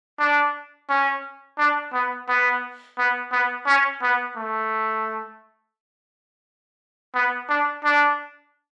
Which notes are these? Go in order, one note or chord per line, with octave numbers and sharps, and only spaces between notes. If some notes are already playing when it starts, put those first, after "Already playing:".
D4
C#4
D4
B3
B3
B3
B3
C#4
B3
A3
B3
D4
D4